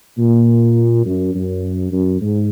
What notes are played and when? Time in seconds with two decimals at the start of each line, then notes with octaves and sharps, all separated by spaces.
0.18 A#2
1.05 F#2
1.34 F#2
1.92 F#2
2.21 G#2